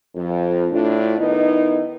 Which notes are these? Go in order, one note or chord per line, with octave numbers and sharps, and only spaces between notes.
F2
A2 D4 F4
D#3 B3 D#4 E4 D#5